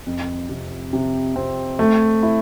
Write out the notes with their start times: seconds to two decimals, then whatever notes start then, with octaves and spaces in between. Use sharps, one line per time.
0.07 F2
0.49 C3
0.93 C3
1.36 C4
1.79 A3
2.23 E4